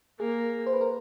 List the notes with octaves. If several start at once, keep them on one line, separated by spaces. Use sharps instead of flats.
A#3 G#4
C5
B4
A#4